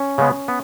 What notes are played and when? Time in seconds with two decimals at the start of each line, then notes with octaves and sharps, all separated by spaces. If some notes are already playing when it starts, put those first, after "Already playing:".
Already playing: C#4
0.18 C#3 G#3 B3
0.48 B3